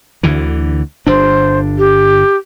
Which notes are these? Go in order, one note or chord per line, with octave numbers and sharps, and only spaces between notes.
D2 D3 E3
G1 D4 C5
G4